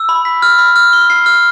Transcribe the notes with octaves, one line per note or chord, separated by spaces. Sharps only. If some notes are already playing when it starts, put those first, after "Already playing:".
Already playing: E6
B5
B6
F6
B5
F6
G7
C7
F6